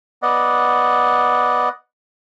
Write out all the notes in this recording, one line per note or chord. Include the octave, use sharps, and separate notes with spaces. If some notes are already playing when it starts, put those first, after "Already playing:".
B3 D5 D#5 F#5